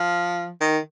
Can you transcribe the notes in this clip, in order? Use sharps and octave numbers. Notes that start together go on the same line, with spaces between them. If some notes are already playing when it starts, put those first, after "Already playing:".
Already playing: F3
D#3